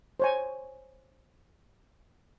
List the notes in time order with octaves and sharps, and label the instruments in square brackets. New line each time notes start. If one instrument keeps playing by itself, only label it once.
[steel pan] C5 C#5 G#5